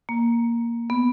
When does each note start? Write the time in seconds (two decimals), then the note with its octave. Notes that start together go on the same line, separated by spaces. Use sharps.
0.09 A#3
0.90 B3